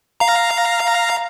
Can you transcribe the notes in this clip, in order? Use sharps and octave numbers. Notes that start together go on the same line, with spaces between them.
F5 A#5